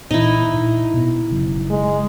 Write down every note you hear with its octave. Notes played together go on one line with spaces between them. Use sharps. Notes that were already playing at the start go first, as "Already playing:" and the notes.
A#2 E3 D#4 E4
A#2
B2 B3
F#1 C#3 F#3
G#3